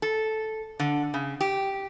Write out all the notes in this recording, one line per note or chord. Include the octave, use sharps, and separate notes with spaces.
A4
D3
C#3
G4